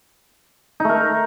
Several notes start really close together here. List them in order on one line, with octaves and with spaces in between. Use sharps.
D#4 A3 A#4